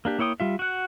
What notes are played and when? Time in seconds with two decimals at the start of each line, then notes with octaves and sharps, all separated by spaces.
0.05 A#3 D4 G4
0.19 A#3 E4 C#5 G5 D#6
0.40 G3 F4 E5
0.59 F#4 F#5